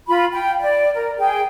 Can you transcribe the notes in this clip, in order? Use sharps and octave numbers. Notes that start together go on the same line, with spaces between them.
F4 B5
G5
D5
A#4
G#4 G5